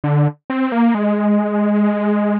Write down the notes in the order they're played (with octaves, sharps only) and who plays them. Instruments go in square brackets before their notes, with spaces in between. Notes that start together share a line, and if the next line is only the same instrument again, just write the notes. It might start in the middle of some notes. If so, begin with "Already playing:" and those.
[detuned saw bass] D3
C4
A#3
G#3